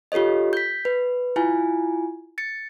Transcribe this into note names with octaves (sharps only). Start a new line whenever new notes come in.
F4 G4 A4 C#5 D#5
G6 B6
B4
E4 F4 G#5
A6 C#7